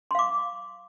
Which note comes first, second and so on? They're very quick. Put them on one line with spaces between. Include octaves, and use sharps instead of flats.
C6 F5 D6